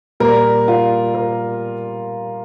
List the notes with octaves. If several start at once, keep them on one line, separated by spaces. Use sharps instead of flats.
A#2 G3 A#4
F4
A#4